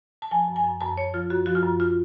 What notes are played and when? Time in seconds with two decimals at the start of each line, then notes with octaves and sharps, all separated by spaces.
0.22 A5
0.31 F3 G#5
0.48 F#2
0.56 G#5
0.64 F#2
0.81 F#2 A5
0.97 F#2 C#5
1.14 F3 F4
1.30 F#2 F#4
1.46 F3 F#4
1.55 F4
1.63 F#2
1.80 F4